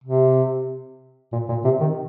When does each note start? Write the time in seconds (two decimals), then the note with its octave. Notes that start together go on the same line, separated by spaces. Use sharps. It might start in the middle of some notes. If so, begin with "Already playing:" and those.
0.04 C3
1.33 A#2
1.49 A#2
1.65 C3
1.80 D#3